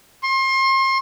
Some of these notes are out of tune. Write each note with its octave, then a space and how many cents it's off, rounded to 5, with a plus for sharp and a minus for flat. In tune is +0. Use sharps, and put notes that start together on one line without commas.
C6 +35